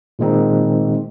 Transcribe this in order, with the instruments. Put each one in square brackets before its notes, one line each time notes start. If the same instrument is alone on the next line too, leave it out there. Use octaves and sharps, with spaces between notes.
[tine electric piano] A#2 D#3 G#3 C4 D#4